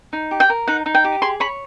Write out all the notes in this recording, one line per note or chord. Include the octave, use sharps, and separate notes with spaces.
D#4
G4
G5
A#4
D#4 F#5
D#4
G5
G4
G#4 C6
C#5 B5